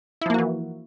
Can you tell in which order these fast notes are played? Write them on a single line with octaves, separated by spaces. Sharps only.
E4 F3 A#3 F#4 E3